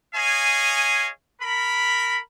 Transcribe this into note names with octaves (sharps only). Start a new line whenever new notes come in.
G#4 C#5 D#5 F5 G#5
A#4 B5